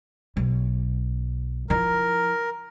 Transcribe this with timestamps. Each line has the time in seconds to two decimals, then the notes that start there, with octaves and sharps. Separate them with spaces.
0.37 B1
1.70 F3 E4 A#4